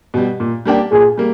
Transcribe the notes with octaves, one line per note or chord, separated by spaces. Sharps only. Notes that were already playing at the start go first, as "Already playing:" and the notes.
B2 G3
A#2
G3 A#3 D4 G4
A#2 G#4
G3 A#3